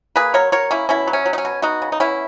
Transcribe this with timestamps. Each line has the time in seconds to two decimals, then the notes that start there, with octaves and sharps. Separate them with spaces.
0.16 A#3 G#4 B4
0.34 F#3 A#4 C#5
0.52 F#3 A#4 C#5
0.71 A#3 C#4 E4
0.89 B2 C#4 E4
1.07 F#3
1.13 C#4
1.26 F#3
1.33 D#4
1.38 C#4
1.45 B2
1.62 B3 D#4 F#4
1.82 C#3
1.92 D#4
2.00 B3 C#4 E4